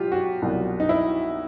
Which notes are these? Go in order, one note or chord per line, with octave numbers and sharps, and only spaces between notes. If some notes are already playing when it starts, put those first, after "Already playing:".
Already playing: B2 F#3 F4 G4
F#4
C2 B2 F#3
D#4
E4